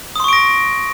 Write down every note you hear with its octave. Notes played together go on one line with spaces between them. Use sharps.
C6 C#6 D#6 A#6 D7